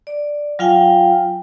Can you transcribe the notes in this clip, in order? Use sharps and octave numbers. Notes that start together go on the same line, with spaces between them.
D5
F#3 F4 F5 G5 G#5